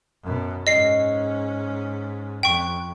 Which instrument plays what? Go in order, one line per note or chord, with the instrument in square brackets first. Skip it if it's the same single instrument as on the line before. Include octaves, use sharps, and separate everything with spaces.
[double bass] F#2 B2
[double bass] G#2 C#4 [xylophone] D#5 C7
[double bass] F2 [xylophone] G5 C#6